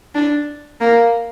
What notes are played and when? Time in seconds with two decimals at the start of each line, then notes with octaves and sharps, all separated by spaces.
0.14 D4
0.80 A#3